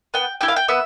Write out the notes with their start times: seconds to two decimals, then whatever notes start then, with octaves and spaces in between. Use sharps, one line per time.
0.14 B3 G5
0.41 E4 G4 G5
0.48 F5
0.56 G5
0.68 B3 E5